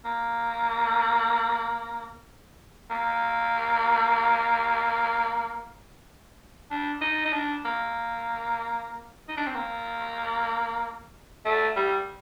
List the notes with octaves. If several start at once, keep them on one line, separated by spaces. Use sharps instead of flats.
A#3
A#3
D4
D#4
D#4
D4
A#3
D#4
D4
C4
A#3
A3
G3